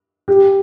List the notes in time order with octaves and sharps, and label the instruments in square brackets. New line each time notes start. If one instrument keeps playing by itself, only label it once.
[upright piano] G4